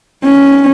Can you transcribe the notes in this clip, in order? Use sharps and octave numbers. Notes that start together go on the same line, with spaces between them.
C#4